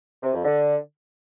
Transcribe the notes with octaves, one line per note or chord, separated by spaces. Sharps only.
C3
F2
D3